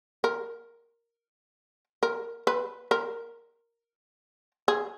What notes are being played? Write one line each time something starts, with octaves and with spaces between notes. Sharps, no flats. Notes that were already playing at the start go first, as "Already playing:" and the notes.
A#4
A#4
B4
A#4
G#4